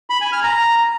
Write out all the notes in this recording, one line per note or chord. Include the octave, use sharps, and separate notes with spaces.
B5
G#5
F6
A#5